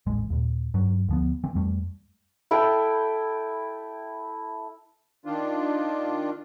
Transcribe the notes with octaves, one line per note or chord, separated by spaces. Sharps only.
D#1 A1 G#3
D#2 A#2
G2 F#3
D2 F3 B3
E3 C4
F2 G3 A3
E4 A4 G5
D#3 D4 F4